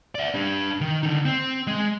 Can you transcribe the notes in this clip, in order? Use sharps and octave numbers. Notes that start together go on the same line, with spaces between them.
D5 E5
D4 G4
D#3
D3 D#4
C4
G#3